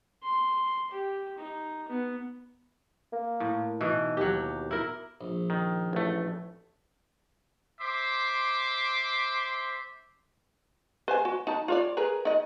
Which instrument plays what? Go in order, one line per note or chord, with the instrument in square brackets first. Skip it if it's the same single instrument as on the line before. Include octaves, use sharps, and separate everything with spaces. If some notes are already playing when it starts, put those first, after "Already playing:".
[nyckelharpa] C6
G4
D#4
B3
[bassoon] A#3
[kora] A2
[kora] B2 E3 [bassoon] D#4
[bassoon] D#2 [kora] F#3 G4
[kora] E4 A#4
[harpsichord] A#1
[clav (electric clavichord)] D#3
A1 A3
[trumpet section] C5 E5 C6 D6
[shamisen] B4 C5 G#5
F#4
D#4 A5
F4 C#5 D5
G#4 A#4 B4
D#4 D#5